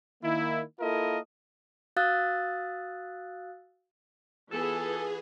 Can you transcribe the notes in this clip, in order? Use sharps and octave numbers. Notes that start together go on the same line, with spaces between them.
D#3 A#3 E4
A#3 E4 F4 A4 A#4 D#5
F#4 F5 D#6 E6 F#6 A6
E3 B3 F4 G#4 A4